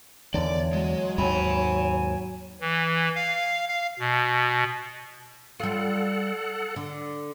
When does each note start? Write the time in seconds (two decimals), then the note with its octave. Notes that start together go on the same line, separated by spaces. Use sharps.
0.34 E2 D3 D#3 C#5 D5
0.73 F#3 G#3
1.18 D#2 G#2 G#5 B5
2.61 E3
3.16 F5
3.68 F5
3.99 B2
5.60 G3 F4 A4 F#5
6.76 D3